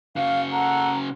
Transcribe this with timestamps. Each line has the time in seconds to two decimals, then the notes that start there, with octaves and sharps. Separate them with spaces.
0.16 C#3 F#4 F5
0.52 A4 F#5 A#5